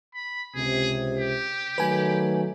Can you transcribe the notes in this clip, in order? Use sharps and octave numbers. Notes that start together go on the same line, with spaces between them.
B5
C#2 C3 G#4
G4
D#3 F#3 A3 B4 G#5